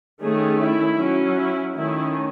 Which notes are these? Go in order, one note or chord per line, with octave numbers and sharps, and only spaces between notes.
D#3 A3 C#4 G#4
E4
F#3 C#4
E4
D#3 A3 C#4 E4